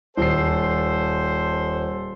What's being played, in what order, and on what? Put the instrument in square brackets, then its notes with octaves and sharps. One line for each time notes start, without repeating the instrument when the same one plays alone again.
[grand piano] D#1 C7 [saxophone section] A4 C5